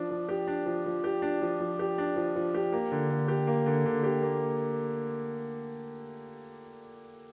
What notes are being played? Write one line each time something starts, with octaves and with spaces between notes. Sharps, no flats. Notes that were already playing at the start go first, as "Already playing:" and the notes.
Already playing: F3 D4
F3
G4
D4
F3
F3
G4
D4
F3
F3
G4
D4
F3
F3
G4
A#3
D3
D3
G4
A#3
D3
D3
G4
A#3